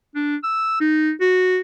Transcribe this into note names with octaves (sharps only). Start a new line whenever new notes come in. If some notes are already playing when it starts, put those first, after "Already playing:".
D4
E6
D#4
F#4